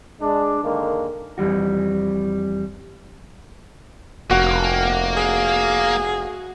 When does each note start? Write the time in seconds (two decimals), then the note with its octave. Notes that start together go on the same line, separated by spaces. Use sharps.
0.22 G#3 D4
0.64 D3 D#3 G#3 A#3
1.38 F2 E3 G3 F#4
4.31 F1 A#3 F#4
5.16 G#4